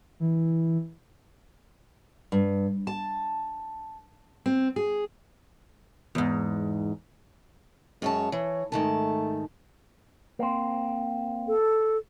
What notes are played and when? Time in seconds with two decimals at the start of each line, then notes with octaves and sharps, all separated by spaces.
0.20 E3
2.32 G2
2.87 A5
4.46 C4
4.76 G#4
6.15 E2 G#2
8.02 F#2 G#3 C#5 A5
8.32 E3 C#5
8.72 G#2 D#3 A3 A5
10.39 A#3 C4
11.48 A4